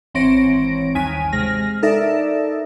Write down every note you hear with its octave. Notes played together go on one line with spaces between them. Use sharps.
G#1 E3 C4 C#5 A#6 D7
G1 D#2 G#5 B6 D#7
C3 G#3 F6 A#6
D#4 A4 A#4 D5 E5